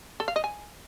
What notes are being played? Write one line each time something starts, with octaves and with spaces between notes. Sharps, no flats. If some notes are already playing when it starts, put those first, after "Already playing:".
A4
F5
D#5
G#5